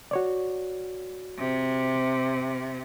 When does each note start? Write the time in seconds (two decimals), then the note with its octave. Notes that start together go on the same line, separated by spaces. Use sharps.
0.11 F#4 C#5 D5
1.38 C3